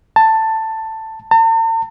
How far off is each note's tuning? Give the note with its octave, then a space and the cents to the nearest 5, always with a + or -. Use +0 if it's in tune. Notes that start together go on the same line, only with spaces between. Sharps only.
A5 +10
A5 +45